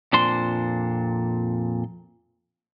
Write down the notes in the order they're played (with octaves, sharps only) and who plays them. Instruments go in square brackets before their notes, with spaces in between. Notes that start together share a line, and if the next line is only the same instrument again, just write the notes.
[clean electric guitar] F2 A#2 D4 C5 C6